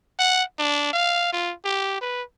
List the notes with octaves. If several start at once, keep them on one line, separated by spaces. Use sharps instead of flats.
F#5
D4
F5
F4
G4
B4